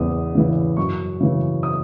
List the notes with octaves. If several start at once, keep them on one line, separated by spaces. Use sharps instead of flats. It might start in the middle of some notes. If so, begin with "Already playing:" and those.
Already playing: E2 C#3 D#6
C#3 E3
F#2 C#6
C#3 E3
D#6